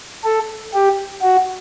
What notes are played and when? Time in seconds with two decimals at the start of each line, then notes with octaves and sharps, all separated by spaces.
0.24 A4
0.74 G4
1.22 F#4